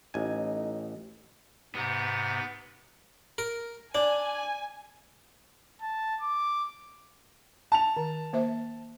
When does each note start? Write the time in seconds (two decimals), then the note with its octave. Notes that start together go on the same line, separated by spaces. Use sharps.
0.14 A1 D#4 G#5
1.75 G#2 C3 B3
3.38 A#4
3.95 D4 D5 G#5
5.82 A5
6.21 D6
7.72 A5 F7
7.97 D#3
8.33 A#3 C5 E5